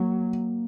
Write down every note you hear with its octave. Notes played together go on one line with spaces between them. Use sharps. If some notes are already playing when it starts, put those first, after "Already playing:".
Already playing: F#3 A#3